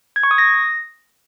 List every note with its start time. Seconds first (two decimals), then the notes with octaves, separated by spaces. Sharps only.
0.16 G#6
0.23 C#6
0.31 D#6
0.38 A#6